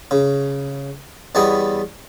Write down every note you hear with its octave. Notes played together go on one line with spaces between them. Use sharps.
C#3
E2 E3 G3 B3 C#5 D#5